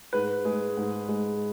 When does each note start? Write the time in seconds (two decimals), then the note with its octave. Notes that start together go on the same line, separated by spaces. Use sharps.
0.13 G#2 B4
0.45 G#3
0.77 G#2
1.08 G#3